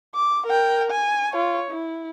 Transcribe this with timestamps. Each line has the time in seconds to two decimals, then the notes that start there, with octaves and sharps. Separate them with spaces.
0.15 D6
0.47 A#4 G5
0.91 G#5
1.32 F4 C#5
1.71 E4